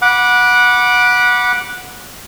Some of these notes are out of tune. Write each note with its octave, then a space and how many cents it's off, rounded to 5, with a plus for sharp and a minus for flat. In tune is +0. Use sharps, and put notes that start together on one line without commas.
F#5 -15 B5 -20 D6 +0